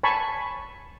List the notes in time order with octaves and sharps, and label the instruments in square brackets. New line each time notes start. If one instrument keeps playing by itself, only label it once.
[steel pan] G#5 A5 B5 C#6